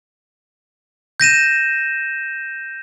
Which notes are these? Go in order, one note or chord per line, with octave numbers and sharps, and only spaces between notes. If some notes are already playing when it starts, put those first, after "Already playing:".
G6 A#6 D#7 E7